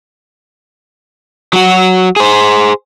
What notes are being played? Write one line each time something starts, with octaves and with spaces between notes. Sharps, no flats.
F#3 F#4
G#4 C5